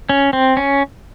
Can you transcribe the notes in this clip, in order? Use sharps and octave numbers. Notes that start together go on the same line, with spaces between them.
C#4
C4
C#4